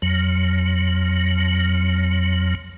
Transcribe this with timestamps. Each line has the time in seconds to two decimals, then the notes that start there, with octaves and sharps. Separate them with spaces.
0.02 F2 F#3